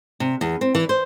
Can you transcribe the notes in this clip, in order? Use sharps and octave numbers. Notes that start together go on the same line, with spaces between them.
C3
E2
C4
E3
C5